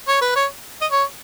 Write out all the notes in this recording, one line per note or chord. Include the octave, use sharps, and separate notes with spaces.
C#5
B4
C#5
D#5
C#5